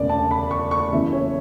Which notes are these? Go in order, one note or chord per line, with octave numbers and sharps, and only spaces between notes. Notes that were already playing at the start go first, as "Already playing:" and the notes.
Already playing: E1 D2 C#3 D5
A5
B5
C#6
C#6
F#1 E2 C#3 E3 E5
C#5